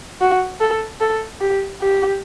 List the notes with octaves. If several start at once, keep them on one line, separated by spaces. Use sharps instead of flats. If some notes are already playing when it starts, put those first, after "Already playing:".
F#4
A4
A4
G4
G4